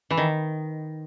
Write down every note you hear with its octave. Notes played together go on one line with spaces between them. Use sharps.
E3
D#3